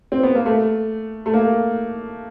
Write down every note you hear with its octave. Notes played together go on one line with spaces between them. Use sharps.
C4
B3
A#3
A3
A3
A#3